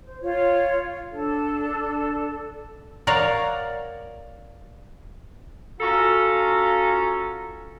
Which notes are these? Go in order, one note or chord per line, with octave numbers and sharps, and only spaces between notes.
C5
F4 C#5
D4 A4
A#4 C#5 D5 F5 F#5 A#5
C#4 F4 F#4 A4 A#5